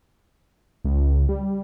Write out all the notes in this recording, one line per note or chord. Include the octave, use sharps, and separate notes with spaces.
C#2
G3